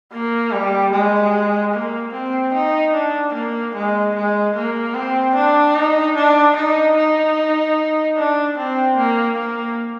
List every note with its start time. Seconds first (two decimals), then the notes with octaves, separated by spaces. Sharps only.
0.12 A#3
0.52 G3
0.92 G#3
1.73 A#3
2.13 C4
2.53 D#4
2.93 D4
3.33 A#3
3.74 G#3
4.15 G#3
4.54 A#3
4.94 C4
5.35 D4
5.75 D#4
6.15 D4
6.55 D#4
6.96 D#4
8.17 D4
8.57 C4
8.97 A#3
9.37 A#3